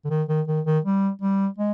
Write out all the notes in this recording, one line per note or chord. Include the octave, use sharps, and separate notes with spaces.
D3
D#3
D#3
D#3
D#3
G3
G3
G#3